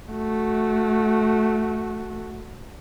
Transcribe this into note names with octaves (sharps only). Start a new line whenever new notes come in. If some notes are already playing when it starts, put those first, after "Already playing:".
A3 F#4